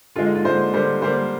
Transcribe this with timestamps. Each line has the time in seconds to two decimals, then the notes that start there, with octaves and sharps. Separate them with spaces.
0.16 D3 G#3 F4
0.26 D#4
0.35 F4
0.45 D3 G#3 C5
0.74 D3 G3 A#3 C5
1.02 D3 G3 A#3 C5